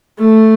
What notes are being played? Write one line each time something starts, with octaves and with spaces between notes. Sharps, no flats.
A3